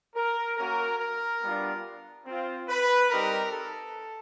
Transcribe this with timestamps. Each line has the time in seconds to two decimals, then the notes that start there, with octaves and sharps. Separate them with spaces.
0.15 A#4
0.58 A#3 C#4 F#4 A#4
1.00 A#4
1.42 G3 B3 D4 F4
2.26 C4 F4
2.69 B4
3.10 G3 C4 D#4 G4 A#4
3.53 A4